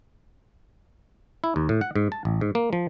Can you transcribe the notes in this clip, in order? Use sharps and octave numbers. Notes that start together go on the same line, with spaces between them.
E4
D#2
A2
F#5
G#2
A5
A1
G#2
A#3
F3